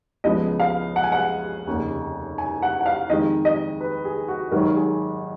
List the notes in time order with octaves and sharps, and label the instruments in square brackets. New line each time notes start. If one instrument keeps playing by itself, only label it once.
[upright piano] C#2 C#3 F3 G#3 B3 D#5
F5
F#5
G#5
F#5
F1 D#2 C#3
G#5
F#5
F#5
F5
F2 D#3 G#3 D#5
D#5
B4
G#4
F#4
G#1 G#2 D#3 F#3 A#4
G#4